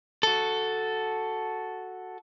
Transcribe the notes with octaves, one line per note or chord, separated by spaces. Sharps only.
F#4 A4